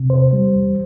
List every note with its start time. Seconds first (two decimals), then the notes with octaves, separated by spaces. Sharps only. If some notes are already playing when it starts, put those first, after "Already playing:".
Already playing: C3
0.10 E2 C5
0.33 G3
0.55 E2